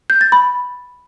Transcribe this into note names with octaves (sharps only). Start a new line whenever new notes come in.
G6
A6
B5